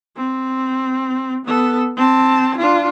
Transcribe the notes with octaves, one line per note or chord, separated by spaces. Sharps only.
C4
B3 A4
C4 A5
D4 F4